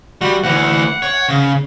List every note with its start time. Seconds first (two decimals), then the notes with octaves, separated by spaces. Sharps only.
0.21 G3 F#4
0.43 D2 E3 F#5
1.02 C#5
1.28 C#3